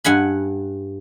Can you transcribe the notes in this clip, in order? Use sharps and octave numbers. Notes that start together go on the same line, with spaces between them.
G2 F#5 G#5 B5